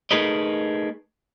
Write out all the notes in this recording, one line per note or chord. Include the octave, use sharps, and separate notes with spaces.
A3 D#4 G#4 A#4 B4 D#5